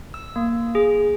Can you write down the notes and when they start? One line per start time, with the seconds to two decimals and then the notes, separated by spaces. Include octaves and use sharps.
0.14 E6
0.36 A#3
0.75 G#4